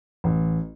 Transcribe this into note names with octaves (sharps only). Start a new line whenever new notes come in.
A1